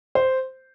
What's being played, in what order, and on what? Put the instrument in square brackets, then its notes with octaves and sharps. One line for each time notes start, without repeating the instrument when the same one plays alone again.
[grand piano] C5